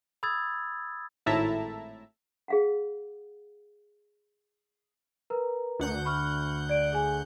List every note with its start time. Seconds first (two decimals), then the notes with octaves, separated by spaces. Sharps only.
0.23 B5 D#6 E6 G#6 A6
1.26 G#1 A2 E4 E5 A5 A#5
2.48 G#4 F5 F#5
5.30 A#4 B4 A#5
5.80 D2 F#5 G6
6.05 B5 C#6 F6
6.69 D5 D7
6.93 G#4 G#5